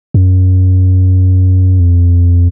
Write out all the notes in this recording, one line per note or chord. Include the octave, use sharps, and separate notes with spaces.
F#2
F2